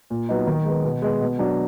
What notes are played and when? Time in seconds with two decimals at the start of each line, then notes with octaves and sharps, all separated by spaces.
0.10 A#2
0.29 F#3 B3 D#4
0.47 D#3
0.65 G#3 B3
0.84 B2
1.02 G#3 B3
1.21 B2
1.39 F#3 D4